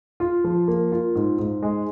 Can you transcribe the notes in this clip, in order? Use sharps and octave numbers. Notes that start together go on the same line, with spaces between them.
F4
F3
A#3
F4
G#2
G#2
G#3